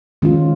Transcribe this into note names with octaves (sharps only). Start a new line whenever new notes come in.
D#3 G#3 C#4 F4